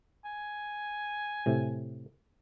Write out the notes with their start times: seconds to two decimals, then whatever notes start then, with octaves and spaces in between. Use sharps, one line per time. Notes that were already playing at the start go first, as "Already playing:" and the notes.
0.25 G#5
1.46 A2 C3